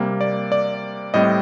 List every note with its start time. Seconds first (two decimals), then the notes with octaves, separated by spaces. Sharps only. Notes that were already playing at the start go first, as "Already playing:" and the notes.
Already playing: C3 G3 A#3
0.21 D5
0.52 D5
1.14 A2 G3 C4 D#5